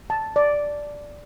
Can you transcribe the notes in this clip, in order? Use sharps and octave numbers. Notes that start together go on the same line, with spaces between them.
A5
D5